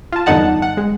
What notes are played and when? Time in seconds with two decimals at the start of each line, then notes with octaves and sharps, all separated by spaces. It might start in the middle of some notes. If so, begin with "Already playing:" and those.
0.13 F4 A5
0.26 E2 G2 D3 D#4 F#5 A5
0.62 F#5
0.77 G#3